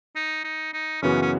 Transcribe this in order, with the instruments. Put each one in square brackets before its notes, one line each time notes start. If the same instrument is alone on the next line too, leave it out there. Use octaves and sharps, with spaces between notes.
[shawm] D#4
D#4
D#4
[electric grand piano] F#2 C#3 E3 B3 F#4 [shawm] C#4
[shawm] C#4